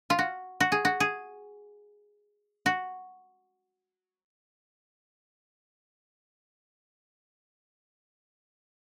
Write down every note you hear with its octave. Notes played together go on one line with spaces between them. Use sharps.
F4
F#4
F#4
G#4
F#4
G#4
F#4